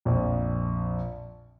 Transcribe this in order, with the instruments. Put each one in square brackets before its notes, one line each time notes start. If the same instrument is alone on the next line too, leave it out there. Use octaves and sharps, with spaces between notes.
[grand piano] A#1 F2